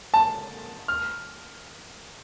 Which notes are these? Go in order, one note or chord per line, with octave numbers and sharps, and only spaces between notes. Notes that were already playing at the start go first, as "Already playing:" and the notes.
A5
F6